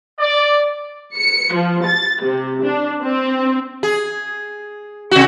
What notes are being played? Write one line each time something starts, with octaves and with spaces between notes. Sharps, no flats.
D5
C#7
F3
A6
C3
D4
C4
G#4
C3 F#4